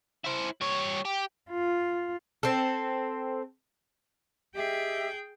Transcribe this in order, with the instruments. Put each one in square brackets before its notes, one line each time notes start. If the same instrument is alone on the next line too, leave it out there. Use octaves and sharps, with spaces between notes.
[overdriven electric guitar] E4 C5
G3 C#5
G4
[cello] F4
[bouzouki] C4 A4
[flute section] G4 D#5 E5 [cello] G#4 G5